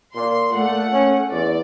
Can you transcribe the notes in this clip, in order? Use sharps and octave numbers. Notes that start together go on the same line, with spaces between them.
A#2 C6
A#2 A3 F#5
C#4
E2 D5